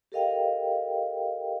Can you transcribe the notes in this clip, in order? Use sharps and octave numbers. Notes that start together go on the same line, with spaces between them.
G4 A4 A#4 D#5 F5 G5